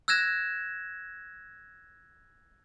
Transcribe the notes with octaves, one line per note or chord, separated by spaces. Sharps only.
E6 F#6 G#6 A#6 E7